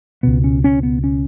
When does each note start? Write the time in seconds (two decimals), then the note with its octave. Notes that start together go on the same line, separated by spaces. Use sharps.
0.23 C#2 B2 B3
0.44 C#4
0.64 C#4
0.83 B3
1.04 C#4